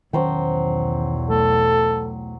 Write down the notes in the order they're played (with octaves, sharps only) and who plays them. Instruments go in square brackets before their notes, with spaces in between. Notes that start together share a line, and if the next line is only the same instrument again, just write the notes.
[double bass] B1 E2 [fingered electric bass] D#3 C#4 [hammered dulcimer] F#3 C5 G5
[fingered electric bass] A3 [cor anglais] A4